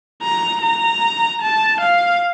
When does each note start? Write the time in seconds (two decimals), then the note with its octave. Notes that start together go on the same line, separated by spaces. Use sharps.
0.22 A#5
0.62 A#5
1.42 A5
1.81 F5